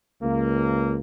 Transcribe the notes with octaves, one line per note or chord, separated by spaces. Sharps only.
C#2 A#3